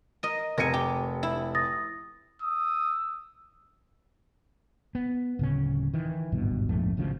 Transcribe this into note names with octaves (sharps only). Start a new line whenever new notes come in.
A#4 D#5
F1 A#4 G#5 C#7
G4
E4
D#6 A6 A#6
D#6 E6
B3
D1 C#3 C#4
D#3 E3
D1 G#1 G2 B2
A#1 F2 G#2 A3
G#1 D2 C#3 F3